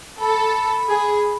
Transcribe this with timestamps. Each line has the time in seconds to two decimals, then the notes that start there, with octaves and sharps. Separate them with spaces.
0.20 A4 B5
0.88 G#4